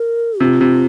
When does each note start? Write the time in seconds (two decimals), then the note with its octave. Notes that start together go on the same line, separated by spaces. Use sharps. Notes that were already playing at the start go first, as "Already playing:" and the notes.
Already playing: A#4
0.40 C3 F4
0.61 C3